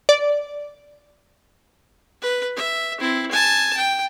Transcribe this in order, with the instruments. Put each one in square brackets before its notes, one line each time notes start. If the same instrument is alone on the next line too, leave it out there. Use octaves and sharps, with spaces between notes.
[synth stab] D5
[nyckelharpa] B4
E5
C4 E4
G#5 A5
G5